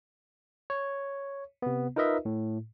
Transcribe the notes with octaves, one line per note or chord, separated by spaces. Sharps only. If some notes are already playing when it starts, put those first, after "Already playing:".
C#5
C3 B3
D#4 F4 A#4 B4 D#5 E5
A2